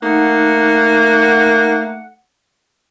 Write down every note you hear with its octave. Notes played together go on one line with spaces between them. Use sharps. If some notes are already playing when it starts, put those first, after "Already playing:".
A3 A#3 D#4 F#5